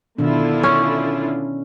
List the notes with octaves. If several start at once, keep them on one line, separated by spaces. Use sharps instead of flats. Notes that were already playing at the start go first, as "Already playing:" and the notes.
B2 D3 D#3 D4 E4 F4
C#4